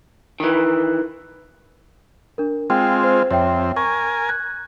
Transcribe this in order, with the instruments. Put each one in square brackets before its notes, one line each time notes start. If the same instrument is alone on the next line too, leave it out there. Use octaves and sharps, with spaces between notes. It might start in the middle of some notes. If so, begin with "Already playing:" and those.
[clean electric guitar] D#3 E3
[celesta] D4 A#4
[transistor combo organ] G#3 C4 F4 [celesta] G5
[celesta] C5
[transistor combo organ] F2 C4 [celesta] C#5 E5 G5
[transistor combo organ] A#4 G#5 [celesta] C#6
[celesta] F#6 G#6